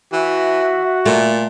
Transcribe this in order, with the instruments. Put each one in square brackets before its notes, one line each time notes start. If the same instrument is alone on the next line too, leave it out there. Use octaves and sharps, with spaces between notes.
[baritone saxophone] E3 [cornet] F#4 [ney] E5
[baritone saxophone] A#2 [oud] A3